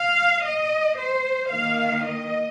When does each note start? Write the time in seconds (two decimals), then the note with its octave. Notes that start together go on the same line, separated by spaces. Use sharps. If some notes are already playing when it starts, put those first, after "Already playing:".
Already playing: F5
0.43 D#5
0.97 C5
1.50 D#3 A#3 F5
2.05 D#5